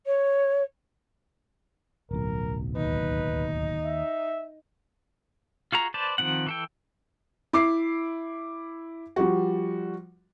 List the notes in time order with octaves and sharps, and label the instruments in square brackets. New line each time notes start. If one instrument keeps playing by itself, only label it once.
[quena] C#5
[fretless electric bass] D1 B1 [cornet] A#4
[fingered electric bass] D#2 [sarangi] D#4 [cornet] B4
[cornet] E5
[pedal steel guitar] F4 F#4 G#4 A#5
B4 C5 D5 A5
D#3 F3 C4 F#5
E3 A4 G5
[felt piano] E4 D6 C7
F3 G3 F#4